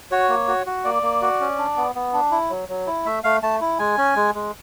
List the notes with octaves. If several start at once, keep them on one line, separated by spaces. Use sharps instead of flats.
F#4 C#5
A#3
F#4
F#4
A#3 D5
A#3
F#4
C#4
D4
B3
B3
D4
E4
F#3
F#3
E4
A3 E5
A3 F5
A3 A5
E4
G#3 G#5
C#4
G#3
G#3